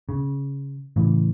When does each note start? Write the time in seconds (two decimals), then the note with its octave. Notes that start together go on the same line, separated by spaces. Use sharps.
0.09 C#3
0.96 A2 C#3 E3